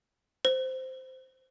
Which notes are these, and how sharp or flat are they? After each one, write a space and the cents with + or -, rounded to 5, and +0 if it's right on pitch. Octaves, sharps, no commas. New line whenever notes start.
C5 -5